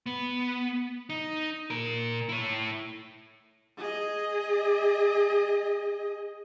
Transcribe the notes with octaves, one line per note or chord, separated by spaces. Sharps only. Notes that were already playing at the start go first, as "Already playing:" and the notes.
B3
D#4
A#2 A#4
E4 C#5
G#4 D#5